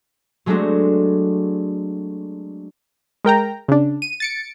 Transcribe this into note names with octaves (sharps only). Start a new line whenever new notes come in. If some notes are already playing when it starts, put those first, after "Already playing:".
F#3 G#3 A3 C4 D4 F#4
G#3 A#4 G5 A#5
C#3 D4
D#7
A6 C#7 D7